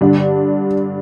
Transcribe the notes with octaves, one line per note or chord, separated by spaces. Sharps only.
G2 D3 D4